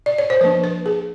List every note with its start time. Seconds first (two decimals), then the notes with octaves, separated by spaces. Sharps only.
0.06 D5
0.18 C#5
0.30 C5
0.41 F3 A#3 D4 B4
0.64 B4
0.86 G#4